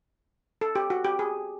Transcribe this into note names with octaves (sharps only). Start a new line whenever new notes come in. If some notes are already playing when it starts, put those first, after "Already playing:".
A4
G4
F#4
G4
G#4